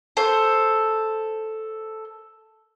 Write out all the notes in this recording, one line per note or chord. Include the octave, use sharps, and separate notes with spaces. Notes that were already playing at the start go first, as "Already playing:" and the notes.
A4 C5